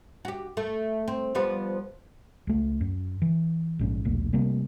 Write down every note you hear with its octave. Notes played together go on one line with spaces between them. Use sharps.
F#4 G4
A3
C4
F3 G3 B3
C#2 A3
F#2
E3
A#1 G#2 C#4
A#1 D#2 B2 A3
C3 G3 A3 A#3